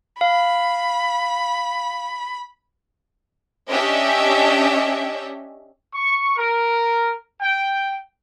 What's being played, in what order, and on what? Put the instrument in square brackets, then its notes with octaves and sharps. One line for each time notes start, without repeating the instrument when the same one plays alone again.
[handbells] F5 [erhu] B5
[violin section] C#4 D4 G4 D#5 E5
[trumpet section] C#6
A#4
G5